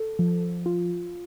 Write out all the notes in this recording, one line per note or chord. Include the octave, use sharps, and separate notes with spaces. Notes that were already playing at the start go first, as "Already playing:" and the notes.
Already playing: A4
F3
F4